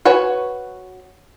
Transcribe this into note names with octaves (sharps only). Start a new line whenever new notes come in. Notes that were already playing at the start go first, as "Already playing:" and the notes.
F#4 B4 C#5 G#5